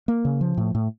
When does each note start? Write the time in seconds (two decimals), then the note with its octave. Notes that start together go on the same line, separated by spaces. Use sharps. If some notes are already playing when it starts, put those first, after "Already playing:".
0.08 A#3
0.25 C#3
0.41 F3
0.57 A2
0.75 A2